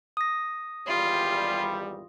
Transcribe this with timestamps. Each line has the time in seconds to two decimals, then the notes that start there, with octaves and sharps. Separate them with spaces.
0.17 D#6 A#6
0.87 G#1 E2 G3 F4